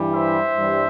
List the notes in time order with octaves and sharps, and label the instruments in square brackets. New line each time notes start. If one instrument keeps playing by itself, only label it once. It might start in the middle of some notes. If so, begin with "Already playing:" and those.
Already playing: [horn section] G2 E3 G3
C5 E5
G2 E3 G3